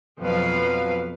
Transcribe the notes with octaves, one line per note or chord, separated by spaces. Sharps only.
F2 B2 F3 F#3 B4 F5